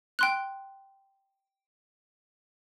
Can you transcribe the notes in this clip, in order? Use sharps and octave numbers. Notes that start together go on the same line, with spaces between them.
G5 C6 F#6